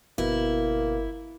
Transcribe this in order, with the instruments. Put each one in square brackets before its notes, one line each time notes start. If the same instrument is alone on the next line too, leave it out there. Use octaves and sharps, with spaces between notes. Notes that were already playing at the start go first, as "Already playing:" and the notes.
[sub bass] G1 [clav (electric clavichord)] B2 [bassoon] A#3 [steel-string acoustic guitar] E4